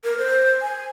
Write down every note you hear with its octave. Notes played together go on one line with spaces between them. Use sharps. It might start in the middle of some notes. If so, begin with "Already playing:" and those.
A#4
C5
G#5